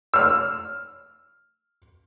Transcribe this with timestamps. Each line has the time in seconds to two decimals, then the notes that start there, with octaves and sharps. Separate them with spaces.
0.14 E6 F6